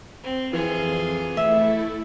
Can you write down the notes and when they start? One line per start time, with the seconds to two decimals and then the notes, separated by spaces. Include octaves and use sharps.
0.23 C4
0.53 F2 E3 F4 G#4
1.37 A3 E4 A4 E5